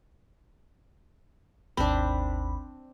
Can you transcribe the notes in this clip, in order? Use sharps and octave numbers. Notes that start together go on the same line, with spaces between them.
G#1 D#2 C4 D4 B5